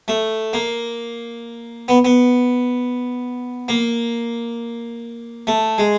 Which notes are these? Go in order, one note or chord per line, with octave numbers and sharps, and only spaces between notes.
A3
A#3
B3
B3
A#3
A3
G#3